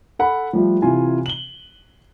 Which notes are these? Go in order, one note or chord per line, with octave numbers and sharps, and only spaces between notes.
A4 F#5 B5
F3 G3 A3 F4
C3 E3 F4 G#5
F#7 G7